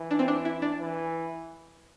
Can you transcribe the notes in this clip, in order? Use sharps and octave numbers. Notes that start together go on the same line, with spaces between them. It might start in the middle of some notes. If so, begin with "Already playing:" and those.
Already playing: E3
D4
C4
D4
E4
D4
E3